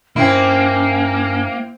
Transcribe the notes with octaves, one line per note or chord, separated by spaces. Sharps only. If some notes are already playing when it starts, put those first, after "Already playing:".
G2 A#3 C4 C#4 E4